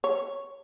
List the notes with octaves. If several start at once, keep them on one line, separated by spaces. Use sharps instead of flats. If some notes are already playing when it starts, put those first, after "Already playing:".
C#5